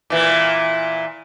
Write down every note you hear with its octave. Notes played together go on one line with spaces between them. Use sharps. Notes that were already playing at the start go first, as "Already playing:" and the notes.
A#2 E3